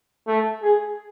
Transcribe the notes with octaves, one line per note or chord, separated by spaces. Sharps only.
A3
G#4